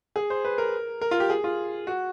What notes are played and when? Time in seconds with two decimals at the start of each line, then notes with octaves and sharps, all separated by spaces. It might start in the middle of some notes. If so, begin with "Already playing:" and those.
0.16 G#4
0.30 C5
0.45 B4
0.58 A#4
1.01 A#4
1.11 F4
1.20 G4
1.30 G#4
1.44 F4
1.87 F#4